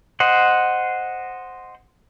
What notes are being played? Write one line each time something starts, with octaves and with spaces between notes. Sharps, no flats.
C5 D#5 F#5